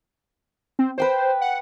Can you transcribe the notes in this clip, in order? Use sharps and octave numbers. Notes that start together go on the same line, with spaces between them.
C4
B4 C5 G5 D6
F#5